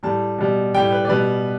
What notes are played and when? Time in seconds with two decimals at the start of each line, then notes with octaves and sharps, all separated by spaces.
0.03 A2 G3 A5
0.38 B2 G3
0.74 A2 G3 G5
0.92 B4
1.05 D5
1.09 B2 G3 B4